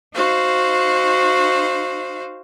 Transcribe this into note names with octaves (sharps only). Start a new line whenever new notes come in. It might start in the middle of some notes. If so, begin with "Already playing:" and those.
D#4 F#4 C5 F5